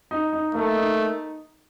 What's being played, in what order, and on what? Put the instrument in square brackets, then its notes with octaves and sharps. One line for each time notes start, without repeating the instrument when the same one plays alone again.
[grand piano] D#4
D#4
[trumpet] A3 [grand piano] A#3
[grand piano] D#4